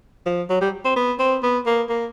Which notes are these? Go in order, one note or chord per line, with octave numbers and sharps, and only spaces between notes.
F3
F#3
G3
C4
B3
C4
B3
A#3
A#3